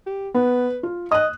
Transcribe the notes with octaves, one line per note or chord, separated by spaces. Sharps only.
G4
B3 B4
F4
D#5 D#6 F#6